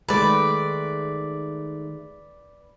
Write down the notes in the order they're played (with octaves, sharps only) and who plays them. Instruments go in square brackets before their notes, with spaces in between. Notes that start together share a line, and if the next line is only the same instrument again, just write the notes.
[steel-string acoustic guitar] D#3 G#3 A3 [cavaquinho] B4 D5